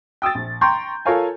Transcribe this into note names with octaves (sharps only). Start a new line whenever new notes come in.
G5 D#6 E6 A6
A#1
G5 A#5 C6 C#6 G6
F4 A4 A#4 C#5 F5 G#5